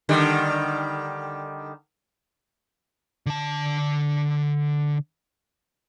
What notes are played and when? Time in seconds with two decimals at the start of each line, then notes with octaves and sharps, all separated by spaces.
0.09 D3 D#3 G3
3.26 D3 A5